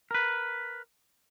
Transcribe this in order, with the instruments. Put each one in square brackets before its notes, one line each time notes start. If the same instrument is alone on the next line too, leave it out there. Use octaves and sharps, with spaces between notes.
[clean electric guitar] A#4 B4